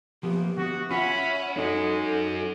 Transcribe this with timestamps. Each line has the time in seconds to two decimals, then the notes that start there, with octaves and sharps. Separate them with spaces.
0.23 F3 A#3 B3 G4
0.57 D#3 A#3 B3 F#4
0.91 C#4 F4 E5 F#5 B5
1.57 G#3 C#4 D#4 F#4 A4 D#5